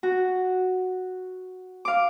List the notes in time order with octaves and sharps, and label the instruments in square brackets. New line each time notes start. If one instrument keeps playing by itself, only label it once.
[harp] F#4
F5 D6